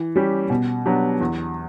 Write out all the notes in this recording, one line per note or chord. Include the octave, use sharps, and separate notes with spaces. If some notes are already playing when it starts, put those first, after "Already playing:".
Already playing: E3
G3 C#4 G4
B2
F#3 B3 D4 G4
E2